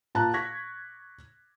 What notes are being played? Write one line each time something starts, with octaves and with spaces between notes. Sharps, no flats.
A#2 A5 A#5 F#6
C#6 G#6 A#6 B6